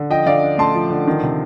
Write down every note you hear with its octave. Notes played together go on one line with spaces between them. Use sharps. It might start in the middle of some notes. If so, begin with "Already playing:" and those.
Already playing: D3
F3 D#5 G5
D3 D5 F5
D4
A3 A5 C6
F3
D3
D#3
C3